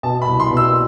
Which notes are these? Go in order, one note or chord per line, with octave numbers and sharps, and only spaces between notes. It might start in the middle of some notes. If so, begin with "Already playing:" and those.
B2 A5
B5
C2
C6
B2
E6